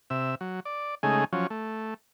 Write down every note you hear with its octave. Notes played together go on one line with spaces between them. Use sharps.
C3 E5
F#3
D5
C#3 G#3 A3 D#4 G#4
F3 F#3 C#4
A3